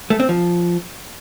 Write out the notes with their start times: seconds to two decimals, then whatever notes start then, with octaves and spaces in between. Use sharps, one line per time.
0.10 A3
0.20 C4
0.29 F3